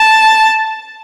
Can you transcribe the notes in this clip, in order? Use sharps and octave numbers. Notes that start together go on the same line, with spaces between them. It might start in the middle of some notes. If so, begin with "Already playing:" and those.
Already playing: A5